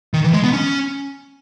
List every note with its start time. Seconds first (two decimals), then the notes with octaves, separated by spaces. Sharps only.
0.14 D#3
0.24 E3
0.33 G#3
0.44 B3
0.53 C#4